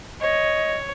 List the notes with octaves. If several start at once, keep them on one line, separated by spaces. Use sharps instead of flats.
C#5 D#5